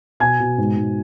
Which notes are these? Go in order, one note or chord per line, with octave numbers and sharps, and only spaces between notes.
B2 G#5 G#6
B2
G#2
G#2